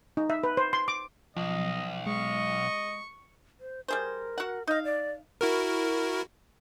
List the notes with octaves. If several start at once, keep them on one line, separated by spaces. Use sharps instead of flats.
D#4
E5
B4
C5
C6
D6
B1 F3 D#5
G#3 D#5 C#6
C5
G3 G#4 A#4 C5
F#4 F#5
D#4 D#5 F5
D5
E4 F#4 A#4